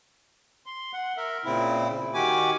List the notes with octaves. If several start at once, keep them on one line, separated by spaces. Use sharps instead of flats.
C6
F#5
A#4 E5
A#2 C#3 C4 E4
D#3 F#4 G4 G#5 D6